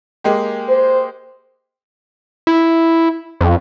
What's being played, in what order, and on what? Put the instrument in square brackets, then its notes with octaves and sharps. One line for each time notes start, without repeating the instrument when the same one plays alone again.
[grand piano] G#3 A#3 G4
[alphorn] C5
[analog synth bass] E4
F2